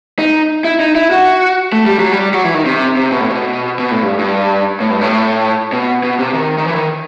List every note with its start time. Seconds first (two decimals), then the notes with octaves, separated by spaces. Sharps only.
0.19 D#4
0.64 E4
0.80 D#4
0.95 E4
1.11 F#4
1.72 A3
1.86 G3
1.99 F#3
2.12 G3
2.34 F#3
2.44 E3
2.54 D#3
2.65 C3
2.96 C3
3.12 B2
3.21 A2
3.30 B2
3.79 B2
3.91 A2
4.03 G2
4.19 G2
4.80 A2
4.91 G2
5.01 A2
5.73 B2
6.03 B2
6.19 C3
6.34 D#3
6.58 D#3
6.66 E3
6.75 D#3